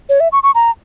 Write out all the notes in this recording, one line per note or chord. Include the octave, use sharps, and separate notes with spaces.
C#5
E5
C#6
C#6
A#5